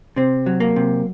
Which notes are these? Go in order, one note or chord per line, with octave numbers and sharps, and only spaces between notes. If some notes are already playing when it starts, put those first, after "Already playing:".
C3 C4
F#3
A#3
C3